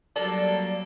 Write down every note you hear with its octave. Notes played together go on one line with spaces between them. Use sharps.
F#3 G3 A#3 D4 A4 D5